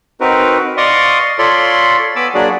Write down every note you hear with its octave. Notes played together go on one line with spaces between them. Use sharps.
C4 D#4 F#4 A#4 B4
D5 D#5 F5 C6 C#6 D#6
F4 A4 C#5 D5 B5 C6
B3 G#5 B5 D6 E6
F#3 A#3 D4 F#4 G#4 D5